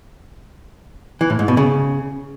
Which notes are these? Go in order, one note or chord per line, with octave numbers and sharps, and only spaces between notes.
E3
A2
G#2
B2
C#3